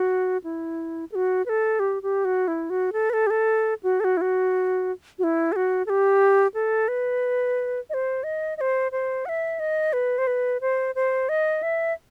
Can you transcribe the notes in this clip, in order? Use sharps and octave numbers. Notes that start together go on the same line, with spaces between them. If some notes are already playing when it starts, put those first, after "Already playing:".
Already playing: F#4
E4
A4
F#4
B4
A4
G4
G4
F#4
E4
F#4
A4
B4
A4
G4
A4
F#4
A4
F#4
E4
F#4
F#4
E4
A4
F#4
A4
G4
A4
B4
D#5
C5
D#5
D#5
C5
C5
F#5
E5
D#5
B4
C5
B4
C5
C5
D#5
E5